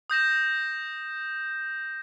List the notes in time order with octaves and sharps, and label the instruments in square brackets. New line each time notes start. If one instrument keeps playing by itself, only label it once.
[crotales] D#6 G6 A#6 E7